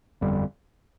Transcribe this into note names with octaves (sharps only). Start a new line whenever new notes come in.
G1 F2 D3 G3